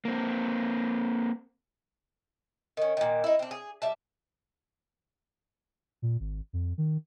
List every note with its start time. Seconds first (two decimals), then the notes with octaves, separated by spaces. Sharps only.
0.05 A#3 C4
2.77 D#3 C#4
2.97 A#2 D#3
3.24 D#4 E4
3.39 C4 D4
3.51 G#4
3.82 G3 E5 A5
6.02 A#2
6.20 G#1
6.53 F2
6.78 D#3